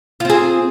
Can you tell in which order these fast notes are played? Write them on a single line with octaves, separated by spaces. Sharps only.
F4 C4 G#4